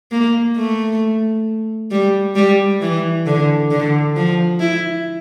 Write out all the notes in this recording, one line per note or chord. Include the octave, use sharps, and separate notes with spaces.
A#3
A3
G3
G3
E3
D3
D3
F3
E4